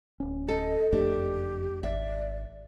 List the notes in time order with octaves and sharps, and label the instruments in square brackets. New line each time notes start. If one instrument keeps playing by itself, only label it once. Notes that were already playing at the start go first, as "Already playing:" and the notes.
[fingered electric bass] D1 C#4
[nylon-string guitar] A4 [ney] D#5
[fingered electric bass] F#1 F2 A3 [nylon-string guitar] D4 [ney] G4
[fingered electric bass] G#1 [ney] D5 [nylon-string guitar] E5